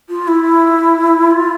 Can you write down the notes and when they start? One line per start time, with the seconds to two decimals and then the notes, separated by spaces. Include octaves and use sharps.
0.10 F4
0.28 E4
1.31 F4